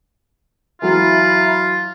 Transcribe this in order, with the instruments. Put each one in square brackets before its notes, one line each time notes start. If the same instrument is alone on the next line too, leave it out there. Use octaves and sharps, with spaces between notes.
[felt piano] E3 F#3 [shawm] F4 [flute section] E5 A#5 B5